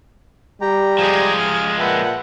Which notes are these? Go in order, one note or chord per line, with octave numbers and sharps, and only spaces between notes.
G3 G4 G5 A#5
F3 G#3 G#4 G#5
F6
A#2 B4 E5 F#5 G5 A5